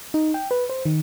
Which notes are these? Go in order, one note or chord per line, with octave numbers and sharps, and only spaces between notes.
D#4
G5
B4
C5
D#3